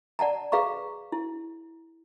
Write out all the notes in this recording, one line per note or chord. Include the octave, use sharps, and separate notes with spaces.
D5 F#5 A5 A#5
G#4 B4 F5 A#5 C#6
E4